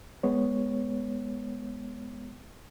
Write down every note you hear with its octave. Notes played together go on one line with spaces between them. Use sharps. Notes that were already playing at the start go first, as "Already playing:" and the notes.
G#3 B3 C#5